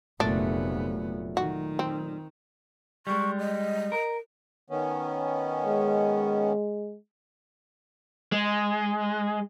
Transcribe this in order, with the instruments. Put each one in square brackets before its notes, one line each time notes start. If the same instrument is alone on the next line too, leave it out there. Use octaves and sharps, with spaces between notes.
[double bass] F1 B3 [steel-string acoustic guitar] A#2 F#3 A3 [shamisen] D4
[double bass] D#3 [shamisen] F#4
[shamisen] C4
[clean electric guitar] G3 G#3 [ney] C#6
[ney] D#5
[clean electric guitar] A#4
[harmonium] D#3 B3 C#4
[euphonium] G#3
[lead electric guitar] G#3